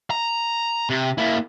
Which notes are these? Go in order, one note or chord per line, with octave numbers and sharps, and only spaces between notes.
A#5
C3
A#3 E4